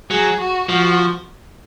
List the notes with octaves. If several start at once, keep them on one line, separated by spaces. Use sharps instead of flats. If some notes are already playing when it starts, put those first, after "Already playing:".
F#3 G#4
F#4
F3 F#4